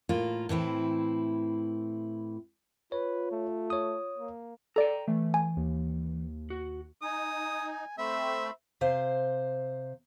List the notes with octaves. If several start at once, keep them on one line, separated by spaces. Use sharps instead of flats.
A2 A#3 F4
A2 E3 C4 E4
F4 B4 C#5
A3
C#5 D#6
A#3
A4 D5 G5 A#5
E3 A3
G#5
D#2
F#4
D#4 G#5 D#6
A3 C4 C5 E5 B5
C3 C5 F5